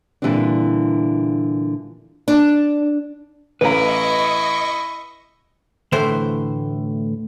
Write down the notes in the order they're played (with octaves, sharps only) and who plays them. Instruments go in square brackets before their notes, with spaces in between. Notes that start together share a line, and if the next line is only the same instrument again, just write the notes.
[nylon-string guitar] A#2 D3 E3 G3 C4 D4
D4
[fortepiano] A1 A#5 [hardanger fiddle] E4 [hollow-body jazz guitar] B4 F5 [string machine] D#5 C#6
[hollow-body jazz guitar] D2 A2 E3 A3 C5